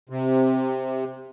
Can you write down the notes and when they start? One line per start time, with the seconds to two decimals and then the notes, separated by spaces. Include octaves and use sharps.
0.09 C3